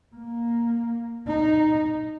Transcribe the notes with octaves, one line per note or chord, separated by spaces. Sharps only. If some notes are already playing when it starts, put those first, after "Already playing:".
A#3
D#4